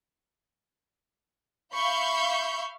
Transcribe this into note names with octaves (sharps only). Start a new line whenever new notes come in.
E5 F5 B5 C#6 G6